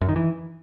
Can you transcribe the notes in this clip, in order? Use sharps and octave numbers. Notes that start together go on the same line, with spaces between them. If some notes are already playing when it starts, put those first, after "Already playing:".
F#2
D#3
E3